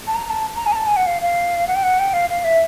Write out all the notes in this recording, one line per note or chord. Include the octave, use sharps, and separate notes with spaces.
A5
A#5
A5
A#5
G#5
A#5
A5
G#5
F#5
F5
F5
F#5
G5
F#5
G5
F5
F5
E5